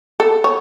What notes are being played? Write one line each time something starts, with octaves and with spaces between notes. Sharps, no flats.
A4
C#5